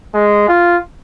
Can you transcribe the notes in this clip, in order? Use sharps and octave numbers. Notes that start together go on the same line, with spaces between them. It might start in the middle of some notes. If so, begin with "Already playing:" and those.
G#3
F4